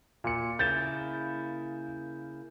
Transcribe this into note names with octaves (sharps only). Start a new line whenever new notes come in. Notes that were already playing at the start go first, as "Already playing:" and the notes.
A#2 C#7
C#3 A#3 E4 G6 A6 E7